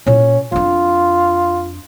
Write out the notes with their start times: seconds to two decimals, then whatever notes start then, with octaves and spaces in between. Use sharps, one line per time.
0.06 A#2 C#4 E4
0.52 F2 D4 F4